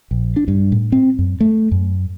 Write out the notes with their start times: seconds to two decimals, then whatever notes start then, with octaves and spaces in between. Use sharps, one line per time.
0.11 A#1
0.36 D4
0.48 G2
0.72 A2
0.92 C4
1.19 F#2
1.41 A3
1.72 F#2